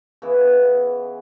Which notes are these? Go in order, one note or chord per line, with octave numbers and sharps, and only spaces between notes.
C#3 E3 B3